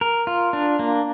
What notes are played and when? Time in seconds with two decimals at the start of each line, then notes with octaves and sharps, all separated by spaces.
0.01 A#4
0.27 F4
0.53 D4
0.79 A#3